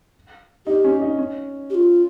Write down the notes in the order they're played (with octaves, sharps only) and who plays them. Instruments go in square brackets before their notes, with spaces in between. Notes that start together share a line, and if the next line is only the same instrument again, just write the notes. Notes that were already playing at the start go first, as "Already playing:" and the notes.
[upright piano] D#4 [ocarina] G4
[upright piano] C#4
D#4
C#4
[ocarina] G4
F4